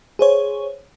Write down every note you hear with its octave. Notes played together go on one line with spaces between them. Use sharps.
G#4 C5 C#5